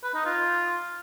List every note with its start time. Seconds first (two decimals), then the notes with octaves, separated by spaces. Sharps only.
0.03 B4
0.15 D#4
0.26 F4